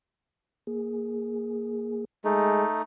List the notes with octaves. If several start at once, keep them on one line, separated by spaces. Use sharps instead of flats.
A#3 G#4
G#3 A3 D#4